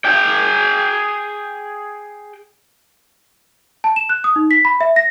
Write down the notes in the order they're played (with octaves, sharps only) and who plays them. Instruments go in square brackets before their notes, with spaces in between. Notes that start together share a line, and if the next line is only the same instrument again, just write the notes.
[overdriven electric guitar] G#4 G5
[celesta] A5
E7
F#6
D#6
D#4
B6
B5
E5
A#6